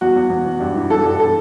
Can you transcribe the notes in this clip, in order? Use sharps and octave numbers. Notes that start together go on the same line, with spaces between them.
E2 F#4
E2
E2
E2
G2
E3
E3 A4
G2
A4